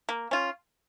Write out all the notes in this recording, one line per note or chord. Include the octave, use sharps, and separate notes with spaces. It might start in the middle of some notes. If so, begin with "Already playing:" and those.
A#3
C#4 F4